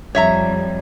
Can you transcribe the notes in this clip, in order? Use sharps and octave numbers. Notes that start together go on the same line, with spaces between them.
F2 G3 C#5 E5 A#5